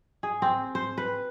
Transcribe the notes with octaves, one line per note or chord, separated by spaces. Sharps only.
G#4
C4
C5
B4